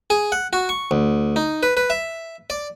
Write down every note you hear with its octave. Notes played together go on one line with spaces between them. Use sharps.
G#4
F#5
F#4
C#6
D2
D#4
B4
B4
E5
D5